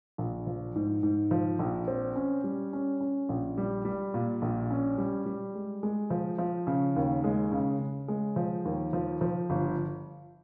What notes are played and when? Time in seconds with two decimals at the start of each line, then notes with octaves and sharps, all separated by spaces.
0.18 A#1
0.47 F3
0.76 G#2
1.03 G#2
1.31 F3
1.59 A#1
1.88 C4
2.16 C#4
2.44 G3
2.73 C#4
3.01 C#4
3.29 A#1
3.58 G3
3.85 G3
4.14 A#2
4.42 A#1
4.71 C#4
4.98 G3
5.26 G3
5.55 G#3
5.83 G#3
6.10 F3
6.38 F3
6.67 C#3
6.96 D#2
7.24 G#3
7.52 C#3
7.79 C#3
8.08 G#3
8.36 F3
8.65 D#2
8.93 F3
9.21 F3
9.50 G1